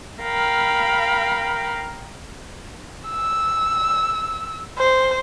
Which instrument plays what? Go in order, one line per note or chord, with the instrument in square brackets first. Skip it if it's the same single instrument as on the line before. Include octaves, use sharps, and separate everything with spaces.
[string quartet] A#4 F5 G5 B5
[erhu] E6
C5